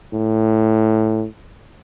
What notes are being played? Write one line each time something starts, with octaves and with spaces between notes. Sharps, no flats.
A2